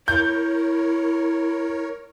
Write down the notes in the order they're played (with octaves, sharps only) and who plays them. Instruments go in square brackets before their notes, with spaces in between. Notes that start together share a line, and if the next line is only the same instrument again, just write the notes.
[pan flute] E4 [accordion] A#4 C#5 [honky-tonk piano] G6